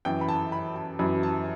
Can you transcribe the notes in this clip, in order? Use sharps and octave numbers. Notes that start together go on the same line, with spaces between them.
F#2 E3 G5
B5
A5
B5
A5
F#2 E3 B5
A5